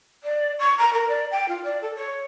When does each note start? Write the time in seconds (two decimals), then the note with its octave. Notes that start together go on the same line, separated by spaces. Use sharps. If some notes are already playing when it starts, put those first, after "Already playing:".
0.23 D5
0.58 C#6
0.78 A#5
0.93 A#4
1.08 D5
1.30 G5
1.48 F4
1.63 D5
1.81 A4
1.95 C#5